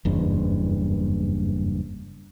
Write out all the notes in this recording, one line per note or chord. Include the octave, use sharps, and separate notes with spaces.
F#1 E2 G2